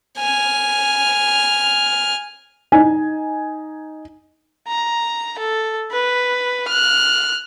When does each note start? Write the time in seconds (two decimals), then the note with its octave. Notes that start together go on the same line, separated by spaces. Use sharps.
0.18 G#5 F6
2.72 D#4 G#5
4.68 A#5
5.39 A4
5.92 B4
6.68 F6 F#6